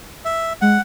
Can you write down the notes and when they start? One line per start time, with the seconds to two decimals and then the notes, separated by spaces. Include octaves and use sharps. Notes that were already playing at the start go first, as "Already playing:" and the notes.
0.25 E5
0.62 G#3 F#5